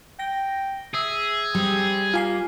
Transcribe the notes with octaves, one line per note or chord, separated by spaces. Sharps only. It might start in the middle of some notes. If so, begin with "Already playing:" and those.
G5 A#6
G#4 E5
G3 C4
A#3 F4 G#5 C7